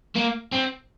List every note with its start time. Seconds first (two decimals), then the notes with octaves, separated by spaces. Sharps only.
0.16 A#3
0.53 C4